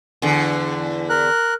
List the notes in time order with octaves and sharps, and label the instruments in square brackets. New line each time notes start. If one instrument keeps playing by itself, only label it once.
[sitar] E2 D3
[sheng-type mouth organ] A#4 F#6